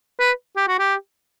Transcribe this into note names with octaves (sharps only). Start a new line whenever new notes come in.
B4
G4
F#4
G4